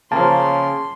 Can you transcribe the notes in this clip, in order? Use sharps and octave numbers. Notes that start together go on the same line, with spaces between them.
C#3 F3 A#3 A5 C6